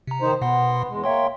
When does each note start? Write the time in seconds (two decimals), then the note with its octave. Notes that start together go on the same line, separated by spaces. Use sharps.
0.07 C3 A#5
0.21 D#3 D#4 C5
0.42 B2 B3 F#5 C6
0.89 E2 G#3
1.04 A#3 C#5 E5 G5 C6